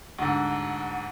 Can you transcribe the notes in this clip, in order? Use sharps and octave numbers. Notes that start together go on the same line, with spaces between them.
D2 G#2 D3